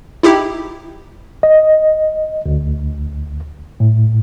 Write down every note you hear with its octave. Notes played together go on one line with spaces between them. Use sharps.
D#4 E4 G4
D#5
D2
A2